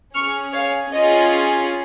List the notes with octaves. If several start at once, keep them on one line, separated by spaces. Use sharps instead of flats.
C#4 G#4 C#6 F6
C#5 F5
C#4 F4 G#4 D#5